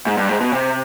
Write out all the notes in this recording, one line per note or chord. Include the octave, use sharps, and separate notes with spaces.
G#2
G2
G#2
B2
C3